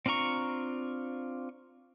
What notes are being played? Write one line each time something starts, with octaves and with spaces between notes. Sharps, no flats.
C4 D4 F4 A#5 C#6